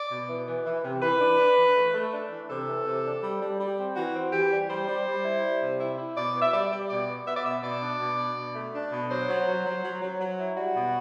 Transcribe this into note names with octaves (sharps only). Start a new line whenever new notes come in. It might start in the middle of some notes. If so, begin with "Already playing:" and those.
Already playing: D5
B2
E3
E3
E3
C3
E3 B4
D4
D4
E3
A3
A3
D4
E3
C3 A4
E3
C3
D4
G3
G3
G3
C4
E3 F#4
C4
E3 G4
G3
G3 C5
G3
G3
E4
G3
C3
E4
E4
B2 D5
B3
E5
G3 D5
G3
B2 D5
B3
B3 E5
D5
B2 E5
B2 D5
D4
B2
D4
B2
A3
D4
B2
F#3 C5
F#3
F#3
F#3
F#3
F#3
F#3
E4
G3 F#4
B2